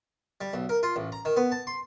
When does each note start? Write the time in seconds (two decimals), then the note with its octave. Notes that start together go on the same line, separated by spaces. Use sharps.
0.41 G3
0.53 B1
0.69 A#4
0.83 F4
0.96 A1
1.12 A#5
1.25 D#3
1.37 B3
1.52 A5
1.67 C6